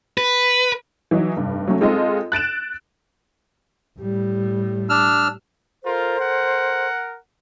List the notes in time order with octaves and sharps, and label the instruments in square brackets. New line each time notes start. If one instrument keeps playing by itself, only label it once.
[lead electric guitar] B4
[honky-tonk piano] E3 F#3 D#4
F1 G2
F#3 A3 C#4
G#3 C4 F4 A4 D#5
F#6 A6 D7 E7
[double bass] A2 G3
[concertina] D4 E6 F6
[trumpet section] F4 A#4 [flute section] A4 C5
[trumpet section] A#4 F#5